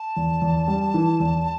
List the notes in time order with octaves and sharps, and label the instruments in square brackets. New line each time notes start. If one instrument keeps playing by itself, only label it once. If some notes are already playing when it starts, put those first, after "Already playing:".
Already playing: [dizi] A5
[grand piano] E2
E2
G3
E3
E2